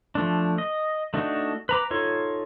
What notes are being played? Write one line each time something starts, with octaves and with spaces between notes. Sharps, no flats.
F3 A3 D4
D#5
A3 D4 D#4 F#4
B4 A#5 D6
D#4 F4 A4 C#5